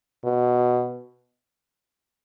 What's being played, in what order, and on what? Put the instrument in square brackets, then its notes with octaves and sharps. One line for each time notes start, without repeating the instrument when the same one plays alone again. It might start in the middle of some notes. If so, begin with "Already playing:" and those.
[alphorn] B2